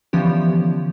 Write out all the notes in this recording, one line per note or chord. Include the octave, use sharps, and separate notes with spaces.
D3 E3 F3 B3 C#4 G4